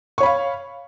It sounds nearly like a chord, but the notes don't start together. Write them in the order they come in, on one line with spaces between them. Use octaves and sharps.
C#6 C#5 B5 F5